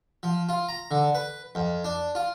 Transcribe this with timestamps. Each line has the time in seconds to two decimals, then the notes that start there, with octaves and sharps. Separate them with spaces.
0.23 F3
0.49 F4
0.69 A#5
0.91 D3
1.15 B4
1.55 F2
1.84 D4
2.15 F4